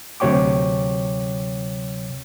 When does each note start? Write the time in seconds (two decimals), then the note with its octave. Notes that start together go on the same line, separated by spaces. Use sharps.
0.20 D2 C3 F#3 C#5 G5 D6